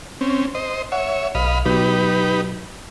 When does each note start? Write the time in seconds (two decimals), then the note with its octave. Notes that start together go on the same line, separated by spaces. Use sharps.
0.21 C4 C#4
0.55 C5 D#5
0.92 C#5 E5 F#5
1.35 B1 D#5 F5 B5
1.65 B2 F#3 D#4 G4 B4